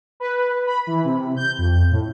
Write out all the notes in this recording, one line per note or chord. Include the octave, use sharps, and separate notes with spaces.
B4
B5
E3
C3
G6
F2
A2